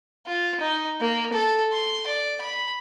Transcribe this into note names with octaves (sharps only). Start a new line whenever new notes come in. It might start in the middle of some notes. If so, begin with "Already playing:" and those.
F4
D#4
A#3
A4
C6
D5
B5